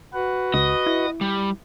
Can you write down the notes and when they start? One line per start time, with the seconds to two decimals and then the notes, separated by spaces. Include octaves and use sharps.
0.13 F#4 B4 F#5
0.54 C#2 D#5
0.86 E4
1.21 G3